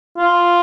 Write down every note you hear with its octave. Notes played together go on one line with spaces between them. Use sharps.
F4